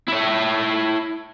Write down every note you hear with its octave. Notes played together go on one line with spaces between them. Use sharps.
E4 C#5